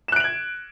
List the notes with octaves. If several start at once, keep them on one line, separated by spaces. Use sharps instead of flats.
F#6 G#6 D7 E7 F#7